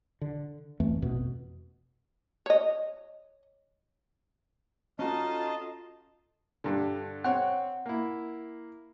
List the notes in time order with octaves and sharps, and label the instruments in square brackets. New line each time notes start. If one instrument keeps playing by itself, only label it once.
[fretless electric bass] D3
F2 E3 A3
A1 F2 B2
[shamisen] C#5 D#5
[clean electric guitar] C#4 F#4 A4 [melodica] D#4 [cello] F4 [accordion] D#5 A5
[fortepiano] G2 D3
[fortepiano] C4 C#5 [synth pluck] F#5
[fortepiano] A#3 E4